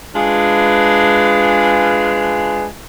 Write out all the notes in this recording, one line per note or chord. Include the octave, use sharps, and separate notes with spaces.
G#3 D4 F4 G#4 B4